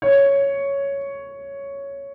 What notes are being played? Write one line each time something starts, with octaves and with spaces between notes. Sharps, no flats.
C#5